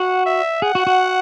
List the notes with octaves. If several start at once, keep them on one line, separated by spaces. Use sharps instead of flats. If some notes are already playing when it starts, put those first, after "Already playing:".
Already playing: F#4 F#5
E5
G#4 F#5
F#4
F#4